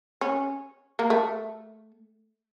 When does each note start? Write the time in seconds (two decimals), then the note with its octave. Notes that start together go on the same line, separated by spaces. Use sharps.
0.21 C#4
0.99 A#3
1.10 A3